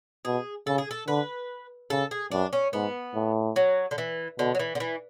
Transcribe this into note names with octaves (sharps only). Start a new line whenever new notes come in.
B2 G#4
C#3 A4
G#4
A4
D3 B4
C#3 A4
G#4
F#2 D4
C#4
G#2 B3
A2
F#3
D3
E3
B2 D3
F#3
E3
D3
E3